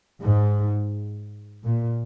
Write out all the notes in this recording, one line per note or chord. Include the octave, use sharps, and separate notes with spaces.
G#2
A#2